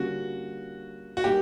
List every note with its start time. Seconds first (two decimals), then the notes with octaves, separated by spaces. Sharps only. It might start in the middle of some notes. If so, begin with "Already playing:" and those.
Already playing: D3 G3 A#3 C#4 F4 F#4
1.17 F#4
1.24 A#2 G3 A#3 D#4 G4